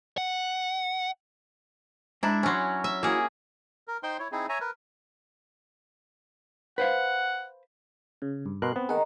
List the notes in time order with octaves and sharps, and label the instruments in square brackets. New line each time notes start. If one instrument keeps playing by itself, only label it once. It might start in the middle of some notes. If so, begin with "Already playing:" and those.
[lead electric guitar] F#5
[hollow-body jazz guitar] G#3 A#5 [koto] D4 E4
[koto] F#3 C#4 [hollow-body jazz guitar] B5 C6
[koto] E5
[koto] A#3 G#4 [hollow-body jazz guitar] E4 F#4
[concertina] A#4
D#4 C5 G5 C6
E4 C#5
C4 D#4 E4 G#4
C#5 E5 G#5 A#5
A#4 B4
[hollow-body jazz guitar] B4 C5 F5 [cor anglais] F#5
[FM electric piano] C#3
G2
[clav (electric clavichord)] B2 A#4 [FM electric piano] C6 F#6
[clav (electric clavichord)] B3 [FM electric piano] C4
[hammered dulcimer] D#3 [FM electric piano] G#4 F#5